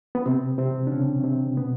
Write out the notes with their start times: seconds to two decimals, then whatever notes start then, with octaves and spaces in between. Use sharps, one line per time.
0.15 B3
0.26 C3 C4
0.58 C3 C4
0.87 D4
0.92 C#3 C#4
1.24 C3 C4
1.57 B2 B3